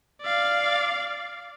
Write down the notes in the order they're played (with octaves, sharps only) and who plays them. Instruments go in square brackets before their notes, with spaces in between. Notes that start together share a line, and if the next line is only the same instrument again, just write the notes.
[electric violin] D5 F5